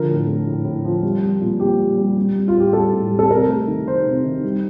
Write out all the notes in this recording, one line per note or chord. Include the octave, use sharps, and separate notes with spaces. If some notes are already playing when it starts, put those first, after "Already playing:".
Already playing: D3 F3 A#4
A2
A3
A2
A2
F3
G3
G3
A#2
A#2 G4
G3
G3
G3
G3
F4
A2
G4
G3 A4
A2
G3
A4
C3 A#4
A3
D#3
D#3 C5
C3
D#3
G3